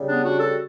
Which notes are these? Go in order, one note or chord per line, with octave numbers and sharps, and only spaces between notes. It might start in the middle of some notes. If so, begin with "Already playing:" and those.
Already playing: C#3 G3
B3 D4
D4 F#4
F#4 A4